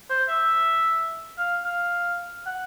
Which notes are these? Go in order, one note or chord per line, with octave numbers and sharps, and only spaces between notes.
C5
E5
F5
F5
F#5